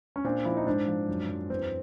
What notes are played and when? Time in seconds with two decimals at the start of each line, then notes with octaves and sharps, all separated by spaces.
0.16 C#4
0.24 A#2 C4 D4
0.45 F3 D4 E4
0.57 D#4
0.66 G#2 C4 D4
0.87 F3
1.09 F#2
1.29 F#2
1.50 E2 C4